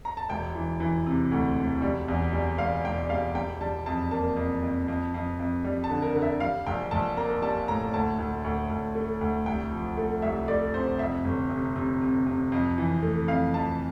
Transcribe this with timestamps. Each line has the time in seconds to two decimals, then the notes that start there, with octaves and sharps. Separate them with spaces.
0.05 A#5
0.17 A5
0.29 E1 G5
0.55 E3
0.80 E3
1.06 C3
1.32 D2
1.58 E1
1.82 G3
2.08 E2
2.33 G3
2.58 E1 F5
2.84 E1 G5
3.10 G3 F5
3.35 G3 G5
3.61 G3 A5
3.86 F2 A5
4.11 A#3 A5
4.36 F2
4.62 F2
4.88 F2
5.14 F2
5.39 F2
5.65 G3
5.84 A5
5.90 D3
6.02 A#4
6.15 D3
6.22 E5
6.40 G3 F5
6.67 A#1 G5
6.91 A#1 A5
7.17 A#3 A#5
7.42 G3 A5
7.68 A2 A#5
7.94 D2 A5
8.18 D2
8.44 D2
8.69 D2
8.95 A3
9.21 D2
9.46 C2 G5
9.72 F3
9.97 A3
10.22 C2 E5
10.48 A3 D5
10.74 C3 C5
10.98 F2 E5
11.24 G1
11.50 C3
11.76 C3
12.01 C3
12.26 C3
12.52 F2
12.78 E3
13.02 A3
13.28 F2 F5
13.54 F2 A5